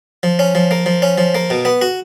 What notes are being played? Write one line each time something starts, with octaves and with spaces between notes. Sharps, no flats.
F3
C#4
F3
A#3
F3
C#4
F3
A#3
B2
B3
F#4